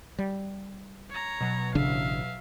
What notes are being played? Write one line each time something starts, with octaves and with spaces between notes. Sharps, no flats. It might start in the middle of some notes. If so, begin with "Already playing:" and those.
G3
C#5 A#5
B2 F#3
A1 C#3 D4 E5 F5